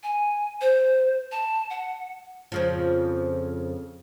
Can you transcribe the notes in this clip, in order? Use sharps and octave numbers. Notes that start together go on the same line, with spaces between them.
G#5
C5
A5
F#5
F2 C#3 F3